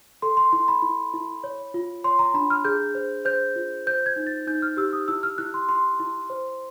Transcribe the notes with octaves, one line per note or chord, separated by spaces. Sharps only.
A4 C6
C6
E4 C6
B5
E4
E4
C#5
F4
C#5 C6
A#5
D4 B5
F6
G#4 G6
C5
C5 G6
F4
C5 G6
G#6
D#4
A6
D#4 G6
F6
G4 E6
D#6
E4 E6
F6
E4 F#6
C6
E4 C6
E4
C5